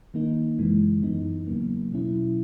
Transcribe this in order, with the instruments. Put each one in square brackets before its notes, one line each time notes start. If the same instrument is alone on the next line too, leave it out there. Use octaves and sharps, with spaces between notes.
[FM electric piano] D#3 A#3 D#4
F#2 C#3 E3 G#3
F#2 E3 B3 D#4
E2 C#3 F#3 A#3
E2 B2 F#3 C#4 E4